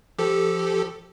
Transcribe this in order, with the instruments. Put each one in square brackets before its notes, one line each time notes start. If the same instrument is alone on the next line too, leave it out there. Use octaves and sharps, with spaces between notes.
[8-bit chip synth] F3 G4 A4